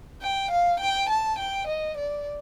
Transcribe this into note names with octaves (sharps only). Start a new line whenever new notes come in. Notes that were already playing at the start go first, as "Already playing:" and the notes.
G5
F5
G5
A5
G5
D#5
D5